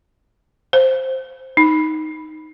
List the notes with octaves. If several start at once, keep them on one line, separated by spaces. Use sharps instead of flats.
C5
D#4